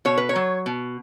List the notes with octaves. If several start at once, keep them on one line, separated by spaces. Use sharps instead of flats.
B2 C#5
B4
C#5
F#3
B2